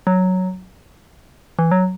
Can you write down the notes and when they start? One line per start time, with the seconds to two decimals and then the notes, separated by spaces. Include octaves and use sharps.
0.07 F#3
1.59 E3
1.71 F#3